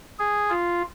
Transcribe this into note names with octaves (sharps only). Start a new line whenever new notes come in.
G#4
F4